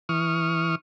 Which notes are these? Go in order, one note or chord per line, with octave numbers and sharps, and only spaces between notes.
E3 C#6 D#6 F6